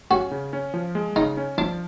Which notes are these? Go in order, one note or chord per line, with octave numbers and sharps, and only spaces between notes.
C#4 F#4
C#3
C#4
F3
G#3
C#3 D#4
C#4
F3 D4